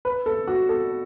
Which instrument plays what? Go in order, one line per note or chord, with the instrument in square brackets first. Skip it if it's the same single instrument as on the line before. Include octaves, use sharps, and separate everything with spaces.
[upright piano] B4
A4
F#4
A4